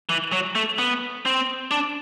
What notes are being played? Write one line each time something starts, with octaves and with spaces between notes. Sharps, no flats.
E3
F#3
A3
B3
C4
D4